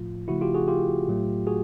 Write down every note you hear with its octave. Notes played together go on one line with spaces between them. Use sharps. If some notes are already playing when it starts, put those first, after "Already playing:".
Already playing: A2 F3 A3 F4
C#3 F3 A3 E4 F#4
F4 G4
F#4 G#4
F4 G4
A2 F#3 A3
F#4 G#4